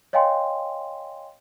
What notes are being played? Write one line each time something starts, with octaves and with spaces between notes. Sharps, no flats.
C#5 D#5 F5 G5 G#5 C6